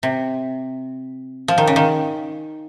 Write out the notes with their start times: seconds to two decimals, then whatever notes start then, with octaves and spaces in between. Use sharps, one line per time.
0.03 C3
1.48 F3
1.58 D#3
1.67 C#3
1.76 D#3